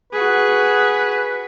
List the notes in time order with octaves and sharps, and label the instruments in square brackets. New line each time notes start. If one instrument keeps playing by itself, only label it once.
[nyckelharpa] F#4 G#4 [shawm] B4